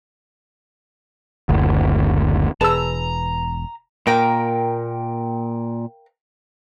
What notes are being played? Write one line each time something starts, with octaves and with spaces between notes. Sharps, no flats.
F#1 D2
E1 G#4 B4 A5 A#5 E6
A#2 A#4 F5 G5